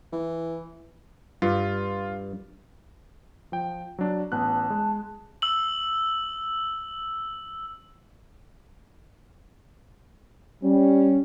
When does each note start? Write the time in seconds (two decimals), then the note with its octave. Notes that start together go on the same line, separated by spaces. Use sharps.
0.12 E3
1.42 G2 F4
3.52 F3 G5
3.98 F#3 D4
4.32 A1 B3 A5 F#6
4.70 G#3
5.42 E6 F#7
10.63 G3 C#4